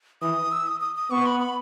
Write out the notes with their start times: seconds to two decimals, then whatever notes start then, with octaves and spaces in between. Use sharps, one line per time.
0.22 E3 D#6
0.52 E6
0.67 D#6
0.81 D#6
0.96 D#6
1.11 B3 C#6
1.26 B5
1.40 B5